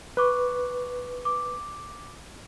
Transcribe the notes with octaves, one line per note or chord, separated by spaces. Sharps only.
B4 C#6 D6 F#6
D6